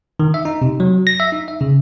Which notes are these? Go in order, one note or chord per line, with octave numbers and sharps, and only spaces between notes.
D#3
E5
D#4
C3
F#3
A#6
E5
D#4
E5
C#3